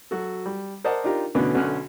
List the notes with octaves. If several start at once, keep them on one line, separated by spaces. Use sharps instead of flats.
F#3 F#4 A4
G3
A#4 C5 D5 D#5 F#5 A5
D4 D#4 F4 G4 A#4
B2 D3 E3 A3 B3 C#4
B1 D3 C#4 F6 F#6